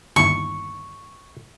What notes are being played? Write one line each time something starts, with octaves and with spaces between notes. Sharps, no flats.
G1 D#2 E4 C#6